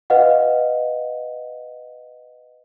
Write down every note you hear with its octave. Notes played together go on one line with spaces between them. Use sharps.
B4 D#5 F5 F#5